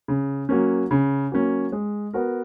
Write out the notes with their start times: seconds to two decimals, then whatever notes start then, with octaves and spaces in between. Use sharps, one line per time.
0.08 C#3
0.49 F#3 A#3 C#4
0.91 C#3
1.32 F#3 A#3 C#4
1.72 G#3
2.14 B3 F#4 A#4